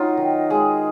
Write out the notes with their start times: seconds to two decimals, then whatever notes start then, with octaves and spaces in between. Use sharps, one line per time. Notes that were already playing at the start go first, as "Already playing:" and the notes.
Already playing: F#3 D#4 F4
0.17 D#3
0.50 G#3 G#4